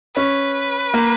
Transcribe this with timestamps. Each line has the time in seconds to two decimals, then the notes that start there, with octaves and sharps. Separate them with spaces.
0.16 C#4 B4
0.94 A#3